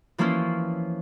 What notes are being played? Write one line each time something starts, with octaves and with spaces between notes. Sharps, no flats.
E3 F3 A#3 C#4 E4 F4